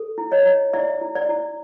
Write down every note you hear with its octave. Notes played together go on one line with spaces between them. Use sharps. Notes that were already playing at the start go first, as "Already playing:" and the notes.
Already playing: A4
E4
C#5 D#5
E4
E4 D5 E5
E4
D5
E4